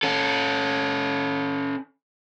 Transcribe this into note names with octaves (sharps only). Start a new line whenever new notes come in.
C#4 A4